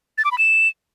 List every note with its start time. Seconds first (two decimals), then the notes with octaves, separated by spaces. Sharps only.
0.18 A6
0.25 D6
0.31 B5
0.38 E7